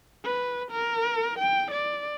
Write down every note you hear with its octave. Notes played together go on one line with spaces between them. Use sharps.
B4
A#4
G5
D5